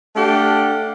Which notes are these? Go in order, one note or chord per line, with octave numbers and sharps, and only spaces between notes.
A3 D4 G4 A4 F5 F#5